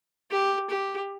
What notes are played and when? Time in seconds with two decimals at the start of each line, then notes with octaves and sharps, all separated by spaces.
0.31 G4
0.70 G4